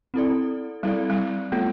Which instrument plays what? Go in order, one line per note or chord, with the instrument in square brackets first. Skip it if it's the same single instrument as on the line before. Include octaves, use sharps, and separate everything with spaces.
[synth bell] C4 E4 A4 D5
[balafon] G3 [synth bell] C4 E4 A4 D5
[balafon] G3
[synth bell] G3 B3 F4 A4 [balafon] A3